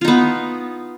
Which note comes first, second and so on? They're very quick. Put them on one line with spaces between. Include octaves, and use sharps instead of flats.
F4 D#4 B3